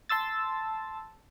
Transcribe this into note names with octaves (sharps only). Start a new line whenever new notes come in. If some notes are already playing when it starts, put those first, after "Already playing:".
A5 C6 E6 A6